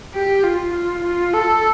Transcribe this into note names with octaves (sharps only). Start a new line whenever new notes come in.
G4
F4
F4
F4
A4